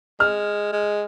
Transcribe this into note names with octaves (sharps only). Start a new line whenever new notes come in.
G#3 F6
G#3